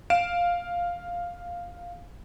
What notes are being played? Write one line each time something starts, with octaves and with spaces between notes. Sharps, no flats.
F5 D7 E7